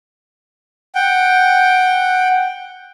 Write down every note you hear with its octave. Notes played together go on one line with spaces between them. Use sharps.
F#5 G5